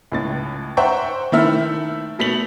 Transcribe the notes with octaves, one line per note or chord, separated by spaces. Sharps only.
C#2 A2 A6
C5 E5 F#5 G5 A#5 C#6
D#3 A3 E4 E5 E6 F6
B2 A3 B6 F7 F#7